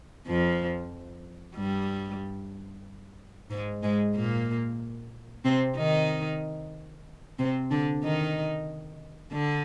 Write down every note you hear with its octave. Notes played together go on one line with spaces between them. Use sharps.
F2 F3
G2 G3
G#2 G#3
G#2 G#3
A#2 A#3
C3 C4
D#3 D#4
C3 C4
D3 D4
D#3 D#4
D3 D4